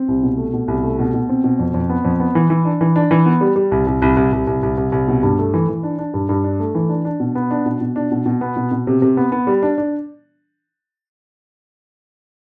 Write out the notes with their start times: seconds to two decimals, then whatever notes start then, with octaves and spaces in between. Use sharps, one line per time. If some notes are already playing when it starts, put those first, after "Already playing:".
Already playing: C4
0.08 C2
0.23 B2
0.37 A3
0.53 B2
0.68 C2
0.83 A3
0.99 B2
1.14 B2
1.29 C4
1.44 B2
1.59 F2
1.74 F2
1.90 B3
2.05 F2
2.20 B3
2.35 E3
2.50 E3
2.65 D4
2.81 E3
2.96 D4
3.11 E3
3.26 B3
3.41 G3
3.56 G3
3.72 C2
3.87 C2
4.02 C2
4.17 C2
4.32 C2
4.47 C2
4.63 C2
4.78 C2
4.92 C2
5.08 B2
5.23 G2
5.38 A3
5.54 E3
5.68 E3
5.83 D4
5.98 D4
6.14 G2
6.29 G2
6.44 D4
6.60 A3
6.75 E3
6.89 D4
7.05 D4
7.20 B2
7.35 B3
7.51 D4
7.66 B2
7.81 B2
7.96 D4
8.12 B2
8.26 B2
8.41 B3
8.56 B2
8.72 B2
8.87 C3
9.02 C3
9.17 B3
9.32 B3
9.47 G3
9.63 D4
9.78 D4